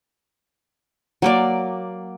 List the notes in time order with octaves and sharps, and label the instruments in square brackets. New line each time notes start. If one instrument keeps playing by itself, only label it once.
[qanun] F#3 A#3 D5